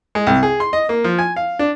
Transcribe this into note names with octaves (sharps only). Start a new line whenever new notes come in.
G#3
C2
G#4
C6
D#5
A#3
F3
G#5
F5
D4